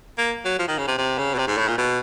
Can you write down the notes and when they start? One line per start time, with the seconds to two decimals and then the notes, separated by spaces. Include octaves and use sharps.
0.18 A#3
0.45 F#3
0.59 F3
0.68 D#3
0.78 C#3
0.87 C3
0.98 C3
1.18 C#3
1.34 B2
1.38 C3
1.47 G#2
1.57 A2
1.68 A#2
1.78 B2